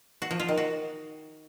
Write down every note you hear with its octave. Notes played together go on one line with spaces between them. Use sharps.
F#4
F3
F4
D#3
F#4